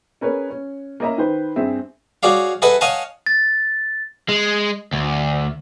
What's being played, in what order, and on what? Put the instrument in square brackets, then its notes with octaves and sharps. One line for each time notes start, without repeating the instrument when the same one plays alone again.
[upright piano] C#4 G#4 A#4 B4 C#5
C#4
A#3 C#4 D#5 E5 A#5
D#3 B4 C5
G2 C4 G#4 E5
[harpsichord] F#4 G#4 C#5 D5 F5
G#4 A4 B4 D#5 E5 F#5
C#5 D#5 F5 F#5 G#5 A5
[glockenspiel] A6
[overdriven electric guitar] G#3
D2